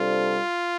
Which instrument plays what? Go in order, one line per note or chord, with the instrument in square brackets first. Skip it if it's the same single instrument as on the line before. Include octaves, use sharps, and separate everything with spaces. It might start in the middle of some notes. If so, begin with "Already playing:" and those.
Already playing: [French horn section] C3 G3 D4 A4 C5 [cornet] F4